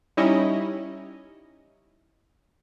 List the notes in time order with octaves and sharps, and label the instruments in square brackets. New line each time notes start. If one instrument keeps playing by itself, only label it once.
[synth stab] G3 C#4 D#4 E4 C#5 D#5